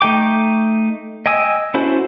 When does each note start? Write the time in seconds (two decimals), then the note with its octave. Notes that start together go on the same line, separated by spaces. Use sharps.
0.01 A3 D#4 G5 D6
1.26 D#5 G5 G#5 D#6 E6
1.74 C#4 E4 F#4 A4 C5